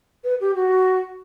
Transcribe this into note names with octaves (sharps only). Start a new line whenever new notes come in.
B4
G4
F#4